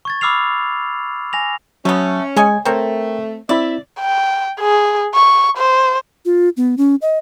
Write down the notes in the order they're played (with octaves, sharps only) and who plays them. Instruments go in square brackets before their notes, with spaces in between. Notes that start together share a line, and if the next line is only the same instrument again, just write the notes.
[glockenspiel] C#6 G#6 A6
B5 D6 E6 F6 C7 F7
G#5 A#6 F7
[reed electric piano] F#3 [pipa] A3 B3 [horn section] C#4
[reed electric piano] G#3 [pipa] C#5 D#5 G#5
[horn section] A3 [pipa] C4 C#5 [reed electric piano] A#4 G5
[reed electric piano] C4 E4 [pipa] D5 [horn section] E5
[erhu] G5
G#4
C#6
C5
[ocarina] F4
B3
C#4
D#5